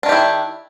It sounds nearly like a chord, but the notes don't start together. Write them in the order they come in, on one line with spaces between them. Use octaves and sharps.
D4 D#3 G4 E4